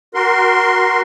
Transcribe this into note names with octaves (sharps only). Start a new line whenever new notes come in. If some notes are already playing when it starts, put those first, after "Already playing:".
F#4 A#4 C6